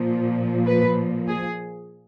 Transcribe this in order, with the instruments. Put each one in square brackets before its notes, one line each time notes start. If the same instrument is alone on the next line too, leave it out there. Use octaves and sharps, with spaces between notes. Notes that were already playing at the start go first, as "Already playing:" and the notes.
Already playing: [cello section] A#2 F3
B4
G#4